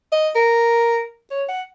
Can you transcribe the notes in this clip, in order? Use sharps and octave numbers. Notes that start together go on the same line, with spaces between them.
D#5
A#4
C#5
F#5